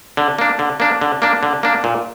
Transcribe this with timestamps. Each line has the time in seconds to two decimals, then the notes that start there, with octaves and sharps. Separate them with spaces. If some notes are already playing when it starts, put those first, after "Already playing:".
0.17 D3
0.39 A#3 D4
0.59 D3
0.80 A#3 D4
1.01 D3
1.22 A#3 D4
1.43 D3
1.63 A#3 D4
1.84 A#2